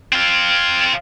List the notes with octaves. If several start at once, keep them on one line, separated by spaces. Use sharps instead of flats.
C4 F4